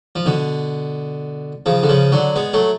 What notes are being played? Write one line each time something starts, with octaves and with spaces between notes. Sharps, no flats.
F3
B2 D3
C#3 F3
D3
C#3 F3
D3 F#3
G#3 B3
F#3 A3